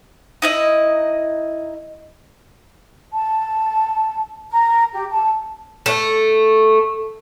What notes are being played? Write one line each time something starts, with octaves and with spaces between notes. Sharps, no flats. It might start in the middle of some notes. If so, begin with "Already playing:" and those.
D#4 E4 D#5
A5
A#5
G4
A5
A3